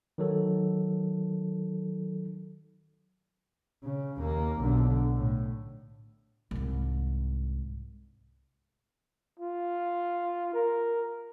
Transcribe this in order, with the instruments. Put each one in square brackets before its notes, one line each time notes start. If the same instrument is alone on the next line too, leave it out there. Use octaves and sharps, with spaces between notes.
[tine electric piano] D#3 F#3 A4
[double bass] C#3
D#2 A#3
B1 D3
A2
[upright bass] C2 G#2
[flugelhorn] F4
A#4